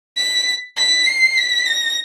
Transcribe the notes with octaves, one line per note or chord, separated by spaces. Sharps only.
B6
B6
C7
B6
A#6